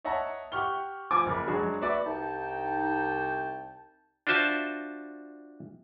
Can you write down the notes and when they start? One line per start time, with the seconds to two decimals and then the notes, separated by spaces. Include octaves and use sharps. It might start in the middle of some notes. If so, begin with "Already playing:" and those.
0.05 C#5 D#5 E5 F#5 A5 A#5
0.52 G4 F#5 C#6 F6 G7
1.11 F3 G#5 D6
1.26 F#1 A#4 B5
1.48 F#3 G#3 D4 F#4 G#4
1.81 F#4 B4 D5 E5
2.05 C2 D#4 G5 A5
4.27 D4 F4 F#4 C5 E5 A5